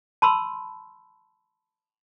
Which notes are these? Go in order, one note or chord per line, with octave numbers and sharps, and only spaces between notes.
A5 B5 C6 E6